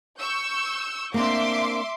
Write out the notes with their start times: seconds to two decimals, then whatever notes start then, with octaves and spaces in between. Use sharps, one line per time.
0.18 C#6 E6 G6
1.14 A#3 C4 D4 E5 C6 D6